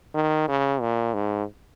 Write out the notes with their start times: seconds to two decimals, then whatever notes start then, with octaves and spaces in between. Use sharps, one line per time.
0.15 D#3
0.48 C#3
0.81 A#2
1.14 G#2